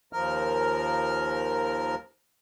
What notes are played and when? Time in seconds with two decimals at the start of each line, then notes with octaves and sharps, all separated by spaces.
0.13 D#2 F3 A#4 F6